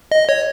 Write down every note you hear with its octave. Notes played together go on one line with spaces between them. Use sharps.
D#5
C#5